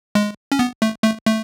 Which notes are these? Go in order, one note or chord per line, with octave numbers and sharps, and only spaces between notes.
G#3
C#4
B3
A3
A3
A3